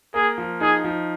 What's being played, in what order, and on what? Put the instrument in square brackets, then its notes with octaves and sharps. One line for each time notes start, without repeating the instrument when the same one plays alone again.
[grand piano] A#3 [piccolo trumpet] G#4
[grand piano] F3
[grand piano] D#4 [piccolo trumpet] G#4
[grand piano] F3